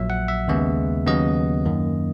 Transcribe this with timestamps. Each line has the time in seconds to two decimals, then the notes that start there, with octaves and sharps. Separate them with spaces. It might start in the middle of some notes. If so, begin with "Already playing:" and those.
Already playing: A#1 A#2 F#3 E5
0.10 F#5
0.28 E5
0.48 D#2 C#3 G#3 B3
1.07 D#2 C#3 F#3 B3 D#5
1.65 F#2 D#3 A#3